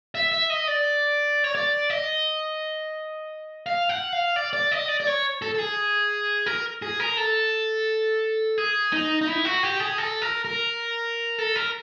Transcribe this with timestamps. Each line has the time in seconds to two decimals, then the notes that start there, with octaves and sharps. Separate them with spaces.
0.15 E5
0.32 E5
0.50 D#5
0.68 D5
1.44 C#5
1.55 D5
1.90 D#5
3.66 F5
3.89 F#5
4.13 F5
4.36 D5
4.53 D5
4.72 D#5
4.88 D5
5.00 D5
5.07 C#5
5.42 A4
5.55 A4
5.58 G#4
6.46 A#4
6.82 G#4
7.00 A#4
7.17 A4
8.58 G#4
8.93 D#4
9.21 D#4
9.27 E4
9.45 F#4
9.63 G4
9.80 G#4
9.98 A4
10.22 A#4
10.45 A#4
11.38 A4
11.56 A#4